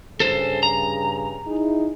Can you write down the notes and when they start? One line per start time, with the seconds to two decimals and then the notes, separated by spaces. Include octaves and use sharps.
0.20 G2 C#3 G#4 A4 C5
0.63 A#5
1.46 D#4 E4 G#4